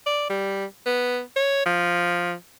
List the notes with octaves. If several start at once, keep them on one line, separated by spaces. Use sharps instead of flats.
D5
G3
B3
C#5
F3